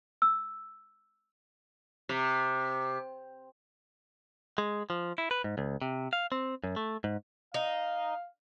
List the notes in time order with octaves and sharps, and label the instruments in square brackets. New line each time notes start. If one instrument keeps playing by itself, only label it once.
[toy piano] E6
[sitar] C3
[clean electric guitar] G#3
F3
E4
B4
G#2
C#2
C3
F5
C4
F#2
A3
G#2
[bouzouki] D#4 [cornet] F5